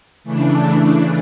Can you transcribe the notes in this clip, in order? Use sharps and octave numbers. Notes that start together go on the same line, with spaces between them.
C#3 E3 A3 D4